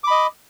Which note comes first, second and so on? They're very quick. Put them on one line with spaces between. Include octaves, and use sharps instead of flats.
D6 B5 D#5